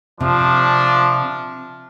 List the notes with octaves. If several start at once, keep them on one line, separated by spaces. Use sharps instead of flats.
C3 F3 D4